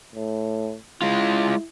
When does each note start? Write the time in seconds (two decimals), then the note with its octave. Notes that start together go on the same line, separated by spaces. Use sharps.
0.15 A2
1.02 G#3 E4 F4